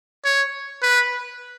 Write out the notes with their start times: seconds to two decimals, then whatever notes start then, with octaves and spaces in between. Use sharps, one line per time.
0.25 C#5
0.82 B4